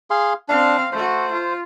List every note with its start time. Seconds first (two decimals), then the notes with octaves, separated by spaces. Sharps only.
0.10 G#4 F5 C6
0.49 C4 D4 F5
0.93 A3 F#4 C5
1.32 F4